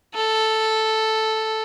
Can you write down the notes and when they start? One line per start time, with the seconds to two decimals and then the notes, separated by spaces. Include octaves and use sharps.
0.14 A4